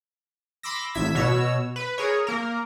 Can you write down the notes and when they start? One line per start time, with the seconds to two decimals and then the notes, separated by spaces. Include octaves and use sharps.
0.63 B5 C6 D6 E6 A#6
0.95 A1 E5 G#6 B6
1.15 B2 F#4 C#5 E6
1.76 B4
1.98 G#4 A#4 C#5
2.27 A#3 A#4